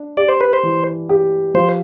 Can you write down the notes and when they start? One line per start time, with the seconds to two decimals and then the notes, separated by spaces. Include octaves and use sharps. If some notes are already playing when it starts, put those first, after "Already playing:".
Already playing: D4
0.17 G4 D5
0.29 C5
0.41 B4
0.53 C5
0.63 E3
1.09 G4
1.54 F3 C5